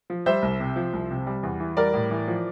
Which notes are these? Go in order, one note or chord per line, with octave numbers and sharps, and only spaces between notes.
F3
G3 C5 E5
C2
C3
F3
C2
C3
G3
E2
E3
G3 A#4 D5
A2
E3
F3